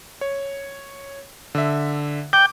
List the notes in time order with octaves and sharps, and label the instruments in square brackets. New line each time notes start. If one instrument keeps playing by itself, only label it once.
[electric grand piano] C#5
D3 E5
[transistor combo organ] G5 [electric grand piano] D6